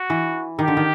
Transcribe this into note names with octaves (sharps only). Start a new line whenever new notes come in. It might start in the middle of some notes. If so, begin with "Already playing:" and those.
Already playing: F#4
E3
D#3 G4
D3
D#3